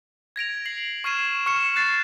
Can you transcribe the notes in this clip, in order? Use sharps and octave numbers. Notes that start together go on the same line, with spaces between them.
G#6 A#6 D7 F7
C7 F#7
C#6 F6 G#6 C7 D#7 E7
C#6 F6 C#7 E7
F#6 A6 C7